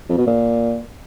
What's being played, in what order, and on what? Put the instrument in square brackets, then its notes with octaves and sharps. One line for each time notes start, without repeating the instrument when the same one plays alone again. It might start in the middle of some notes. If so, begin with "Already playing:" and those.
[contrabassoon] F2
B2
A#2